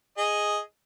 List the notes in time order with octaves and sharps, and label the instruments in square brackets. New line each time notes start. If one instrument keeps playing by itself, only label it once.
[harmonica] G#4 D#5